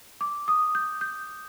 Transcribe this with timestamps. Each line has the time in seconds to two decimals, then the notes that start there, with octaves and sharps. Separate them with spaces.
0.21 D6
0.48 D#6
0.75 G6
1.01 G6